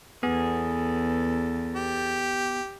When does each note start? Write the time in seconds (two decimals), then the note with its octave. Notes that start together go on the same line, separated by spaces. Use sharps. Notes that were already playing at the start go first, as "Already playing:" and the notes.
0.23 E2 B3 G#4 A4
1.76 G4